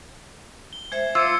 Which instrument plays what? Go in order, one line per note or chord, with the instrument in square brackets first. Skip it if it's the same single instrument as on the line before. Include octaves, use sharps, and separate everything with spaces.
[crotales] G7
[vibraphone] G#3 C5 E5 [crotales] G#6
[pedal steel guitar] F4 [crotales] D6 G#6 C#7 [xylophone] E6